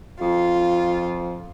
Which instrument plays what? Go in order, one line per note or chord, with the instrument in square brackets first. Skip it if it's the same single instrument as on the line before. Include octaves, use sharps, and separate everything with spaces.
[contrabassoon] F2 [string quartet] F4